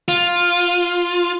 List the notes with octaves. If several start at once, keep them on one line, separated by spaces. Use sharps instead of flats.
F4